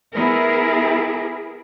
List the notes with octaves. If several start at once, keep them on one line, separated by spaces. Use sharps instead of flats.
B3 E4 G#4 A#4